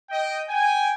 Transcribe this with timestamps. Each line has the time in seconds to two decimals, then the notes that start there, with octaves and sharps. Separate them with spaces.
0.10 D#5 G5
0.49 G5 G#5